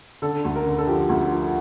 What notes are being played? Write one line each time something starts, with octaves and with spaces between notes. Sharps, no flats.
D3 A4
D2
A#4
D3
A4
F3 G4
D2
F3